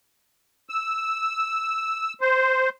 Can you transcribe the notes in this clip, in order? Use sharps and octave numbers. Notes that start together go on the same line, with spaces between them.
E6
C5